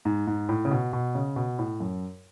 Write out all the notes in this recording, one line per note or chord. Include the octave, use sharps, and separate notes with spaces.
G#2
G#2
A2
C#3
B2
B2
C#3
B2
A2
F#2